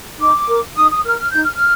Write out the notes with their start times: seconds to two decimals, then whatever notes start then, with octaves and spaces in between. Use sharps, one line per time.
0.19 D#4 D6
0.48 A#4
0.76 D#4 D#6
0.90 D#6
1.05 A#4 F6
1.19 F6
1.31 D#4 G6
1.44 F6